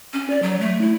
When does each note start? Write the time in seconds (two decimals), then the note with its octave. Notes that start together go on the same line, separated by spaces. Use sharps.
0.13 C#4
0.30 D5
0.42 F#3
0.60 A3
0.81 E4